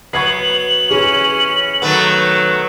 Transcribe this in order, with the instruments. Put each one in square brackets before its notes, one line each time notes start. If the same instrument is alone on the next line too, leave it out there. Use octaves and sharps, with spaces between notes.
[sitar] F#3 B3 [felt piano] C#6 G#6 C7 [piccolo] F#7
[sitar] E3 [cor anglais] C#4 [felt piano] G#4
[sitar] D#3 A3 B3 [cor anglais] F#3